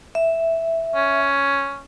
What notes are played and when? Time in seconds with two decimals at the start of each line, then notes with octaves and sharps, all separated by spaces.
0.15 E5
0.95 C#4